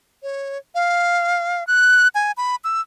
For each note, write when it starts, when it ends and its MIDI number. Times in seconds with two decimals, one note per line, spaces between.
0.23 0.58 73
0.75 1.66 77
1.67 2.08 90
2.15 2.32 80
2.37 2.56 83
2.64 2.81 88